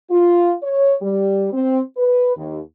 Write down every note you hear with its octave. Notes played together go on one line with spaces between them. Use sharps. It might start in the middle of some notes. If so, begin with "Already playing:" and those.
F4
C#5
G3
C4
B4
D#2